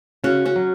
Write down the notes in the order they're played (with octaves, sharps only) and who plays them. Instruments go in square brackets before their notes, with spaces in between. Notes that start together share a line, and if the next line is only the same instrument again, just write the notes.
[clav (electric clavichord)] C#3 [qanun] C#4 F#4
[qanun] C#4 F#4
[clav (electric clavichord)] F#3